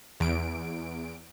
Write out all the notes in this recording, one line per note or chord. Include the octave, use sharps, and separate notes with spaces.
E2 D7